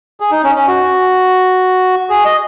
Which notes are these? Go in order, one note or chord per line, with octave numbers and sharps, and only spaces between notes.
G#4
D#4
C#4
C#4
F#4
G#4
D#5